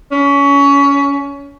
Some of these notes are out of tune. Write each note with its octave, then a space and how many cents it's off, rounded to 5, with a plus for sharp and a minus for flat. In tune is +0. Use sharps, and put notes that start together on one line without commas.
C#4 +25